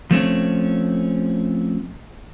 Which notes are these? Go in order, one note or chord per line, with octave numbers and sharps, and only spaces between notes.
F3 A3 C4 C#4